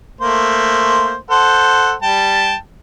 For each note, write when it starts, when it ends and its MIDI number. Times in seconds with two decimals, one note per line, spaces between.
0.21 1.16 57
0.21 1.16 58
0.21 1.16 72
1.30 1.93 69
1.30 1.93 72
1.30 1.93 78
2.02 2.55 55
2.02 2.55 79
2.02 2.55 81